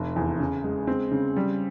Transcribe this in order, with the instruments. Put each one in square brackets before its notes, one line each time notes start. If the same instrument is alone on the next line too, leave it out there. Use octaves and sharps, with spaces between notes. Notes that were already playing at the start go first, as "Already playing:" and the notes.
Already playing: [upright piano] F1
E2
C#3
G#3
C4
C#3
G3